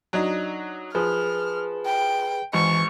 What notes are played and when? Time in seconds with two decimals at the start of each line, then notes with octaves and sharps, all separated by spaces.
0.13 F#3 D4 D#4
0.95 F3 G#4 B4 F6
1.86 G5
2.53 G#1 E3 C#6